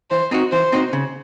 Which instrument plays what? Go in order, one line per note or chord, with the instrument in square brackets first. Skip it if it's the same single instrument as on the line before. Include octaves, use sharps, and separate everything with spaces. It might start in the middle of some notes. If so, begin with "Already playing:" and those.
[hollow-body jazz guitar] E3 [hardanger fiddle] C5
[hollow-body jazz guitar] C4 D#4 F#4
[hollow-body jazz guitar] E3 [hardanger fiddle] C5
[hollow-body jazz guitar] C4 D#4 F#4
C#3